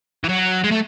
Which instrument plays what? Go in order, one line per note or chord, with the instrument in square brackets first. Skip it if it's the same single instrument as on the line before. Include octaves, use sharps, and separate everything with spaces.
[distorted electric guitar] E3
F#3
G#3
A3